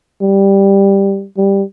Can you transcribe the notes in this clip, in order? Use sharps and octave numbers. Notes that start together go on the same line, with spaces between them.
G3
G3